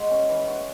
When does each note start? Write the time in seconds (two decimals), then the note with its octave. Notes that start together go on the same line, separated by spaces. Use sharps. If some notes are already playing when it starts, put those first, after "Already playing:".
Already playing: G#3 F#4
0.11 C#4
0.29 E3
0.48 F#4